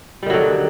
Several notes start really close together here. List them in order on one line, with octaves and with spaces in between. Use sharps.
G3 D#3 F#3 D3